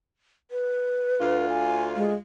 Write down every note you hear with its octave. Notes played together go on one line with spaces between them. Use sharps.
B4
D2 F4
G#5
G#3